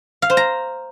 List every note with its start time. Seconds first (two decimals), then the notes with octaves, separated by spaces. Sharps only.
0.22 F5
0.30 C5
0.37 A#5